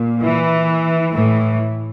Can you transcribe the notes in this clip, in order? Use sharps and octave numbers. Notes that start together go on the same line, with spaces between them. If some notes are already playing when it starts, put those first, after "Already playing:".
Already playing: A#2
E3
A2 E3